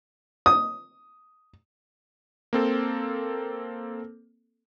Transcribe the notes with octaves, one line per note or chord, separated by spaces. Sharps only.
D#6
A#3 C4 A4